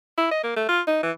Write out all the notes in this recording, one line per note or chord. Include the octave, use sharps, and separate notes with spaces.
E4
D#5
A#3
A3
F4
D#4
E3